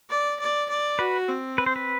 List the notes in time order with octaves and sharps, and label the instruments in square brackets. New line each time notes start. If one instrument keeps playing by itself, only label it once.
[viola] D5
D5
D5
[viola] F#4 [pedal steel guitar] B4
[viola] C4
[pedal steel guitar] B4
C5
B4